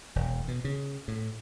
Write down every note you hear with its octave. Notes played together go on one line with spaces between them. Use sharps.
E1
B2
C#3
A2